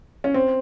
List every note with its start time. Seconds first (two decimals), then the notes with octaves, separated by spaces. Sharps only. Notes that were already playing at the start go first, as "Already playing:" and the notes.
0.24 C#4
0.34 C4